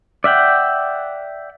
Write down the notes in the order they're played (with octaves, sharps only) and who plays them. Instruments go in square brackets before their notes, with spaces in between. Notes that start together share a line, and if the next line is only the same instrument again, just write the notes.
[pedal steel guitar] D5 E5 F#5 G5